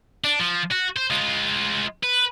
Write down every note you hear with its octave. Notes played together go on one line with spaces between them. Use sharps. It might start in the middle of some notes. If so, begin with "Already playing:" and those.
D4
F3
F#4
C5
G#3 F4
B4